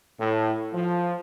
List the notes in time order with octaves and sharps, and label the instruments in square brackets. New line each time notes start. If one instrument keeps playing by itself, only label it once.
[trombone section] A2
F3